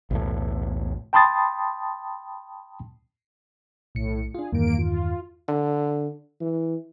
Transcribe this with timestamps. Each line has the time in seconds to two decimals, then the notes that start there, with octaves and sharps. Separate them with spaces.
0.11 B1 E2 A2
1.13 G5 A5 B5 C6 D#6 A6
3.95 B1 A2 C#7
4.35 D4 F4 G#4
4.52 E2 G2 D#3 A#3 D7
4.78 F4
5.49 D3
6.41 E3